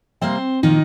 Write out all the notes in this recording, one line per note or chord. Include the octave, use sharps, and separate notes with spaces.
C3 G3 A#3 C4 C5
A#2 D#3 F3 A#3 D#4